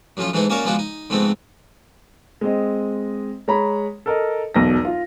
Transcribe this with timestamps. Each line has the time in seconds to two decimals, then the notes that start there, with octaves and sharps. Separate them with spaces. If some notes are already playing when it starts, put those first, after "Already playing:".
0.17 F#2 A2 F3 C#4 F4
0.33 G#2 E3 A3 B3 D#4 E4
0.50 A#3 C#4 F#4 A#4 C#5 D5
0.65 F3 G#3 B3 D4 F4 F#4
0.79 D#4
1.10 F2 G#2 A3 B3 C4
2.41 G#3 C4 D#5
3.48 G#3 C#5 A#5 B5
4.06 A4 A#4 D#5
4.54 E1 B1 B2 A#6
4.85 F4